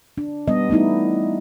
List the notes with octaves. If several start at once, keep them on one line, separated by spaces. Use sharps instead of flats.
D4
G3 B3 D#5
A3 B3 D#4 E4